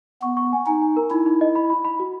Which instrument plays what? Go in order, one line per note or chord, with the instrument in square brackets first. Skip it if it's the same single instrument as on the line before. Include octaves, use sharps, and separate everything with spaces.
[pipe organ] B3 [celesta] C#6
[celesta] C#6
G#5
[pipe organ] D#4 [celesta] G#5
[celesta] G#5
A#4
[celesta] D#4 [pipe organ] E4
[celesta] D#4
D#5
B5
B5
B5
F#4